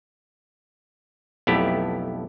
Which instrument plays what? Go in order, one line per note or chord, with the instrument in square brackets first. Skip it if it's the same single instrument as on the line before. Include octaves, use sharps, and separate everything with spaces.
[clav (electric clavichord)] B1 F2 A3 B3 E4 G4